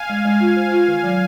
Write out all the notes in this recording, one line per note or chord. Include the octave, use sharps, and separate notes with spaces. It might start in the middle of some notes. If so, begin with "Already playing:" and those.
Already playing: F5 G#5
G#3
G#3
F4
C5
F4
D#3
F#3